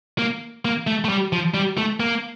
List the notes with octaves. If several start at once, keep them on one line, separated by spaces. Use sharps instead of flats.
A#3
A#3
A3
A3
G3
F3
G3
A3
A#3